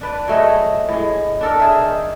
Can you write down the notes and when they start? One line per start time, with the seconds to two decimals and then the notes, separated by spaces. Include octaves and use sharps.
0.01 D4 B4 D5
0.28 F#3 A3 G#4 D#5
0.89 A2 G#3
1.41 D4 A4 A#4
1.60 G#4 E5
1.81 D#3